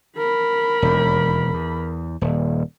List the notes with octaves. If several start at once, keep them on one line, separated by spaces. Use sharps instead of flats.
A#4 B5
E1 D#2
E2
D#1